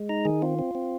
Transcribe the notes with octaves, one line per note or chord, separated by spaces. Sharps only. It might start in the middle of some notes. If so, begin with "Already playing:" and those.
Already playing: G#3
D#4 A#5
D#3 G#4
C4 F4
C4
C4